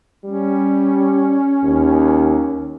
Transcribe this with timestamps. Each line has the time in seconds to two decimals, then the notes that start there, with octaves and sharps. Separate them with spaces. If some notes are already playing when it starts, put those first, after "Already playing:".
0.25 G3 C#4
1.64 D#2